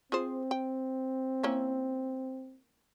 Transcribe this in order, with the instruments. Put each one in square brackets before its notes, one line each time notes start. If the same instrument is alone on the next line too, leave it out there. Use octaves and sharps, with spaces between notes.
[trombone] C4 [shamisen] F4 G#4 C5
[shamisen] G5
A#3 C#4 E4